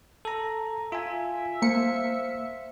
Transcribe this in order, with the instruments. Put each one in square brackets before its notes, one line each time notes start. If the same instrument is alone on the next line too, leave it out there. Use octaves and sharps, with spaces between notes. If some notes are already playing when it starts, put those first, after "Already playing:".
[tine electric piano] A4 A#5
[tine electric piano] F4 G#5 [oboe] E5
[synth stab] A#3 C#7 [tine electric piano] C5 F5